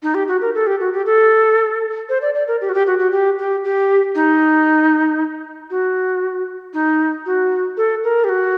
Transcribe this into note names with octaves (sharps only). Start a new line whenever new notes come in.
D#4
G4
F#4
A#4
A4
G4
F#4
G4
A4
C5
D5
D5
A#4
G4
F#4
G4
F#4
F#4
G4
G4
G4
D#4
F#4
D#4
F#4
A4
A#4
G4
F#4